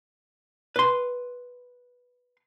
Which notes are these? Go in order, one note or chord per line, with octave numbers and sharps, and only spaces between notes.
B4 C6